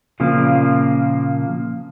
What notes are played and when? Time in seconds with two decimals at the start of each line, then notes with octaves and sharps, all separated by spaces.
0.20 A#2 C#3 F3 A#3